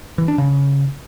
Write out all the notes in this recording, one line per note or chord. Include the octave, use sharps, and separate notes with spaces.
E3
D4
C#3